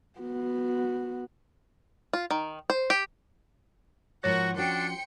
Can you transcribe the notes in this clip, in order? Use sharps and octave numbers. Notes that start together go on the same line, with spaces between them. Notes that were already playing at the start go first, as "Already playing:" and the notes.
B3 F#4
F4
D#3
C5
G4
G#2 F3 F#4 A#4 C#5 F#5 C#6
F3 C#4 D4 F#4 G5 C6 C#7